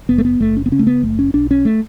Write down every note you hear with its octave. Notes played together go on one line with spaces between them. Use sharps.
F#1 B3
A3
B3
F#1 A3
C#4
B3
C#3 C#4
A3
B3
F#1 A3
C#4
B1 D4
C#4
A3